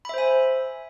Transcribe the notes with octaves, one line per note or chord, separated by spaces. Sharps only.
C5 E5 G#5 B5